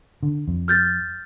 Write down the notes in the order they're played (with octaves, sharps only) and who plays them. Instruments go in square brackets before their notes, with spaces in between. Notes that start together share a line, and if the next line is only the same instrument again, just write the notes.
[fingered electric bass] D3
F2
[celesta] F6 G6 A6